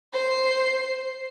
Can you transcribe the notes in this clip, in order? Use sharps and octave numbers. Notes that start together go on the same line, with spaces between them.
C5 C7